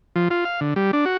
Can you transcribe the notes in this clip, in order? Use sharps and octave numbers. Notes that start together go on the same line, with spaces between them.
F3
F4
F5
D3
G3
D4
F#4